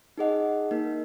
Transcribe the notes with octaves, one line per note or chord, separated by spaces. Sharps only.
D#4 G#4 D#5 F#5
A#3 D#4 A#4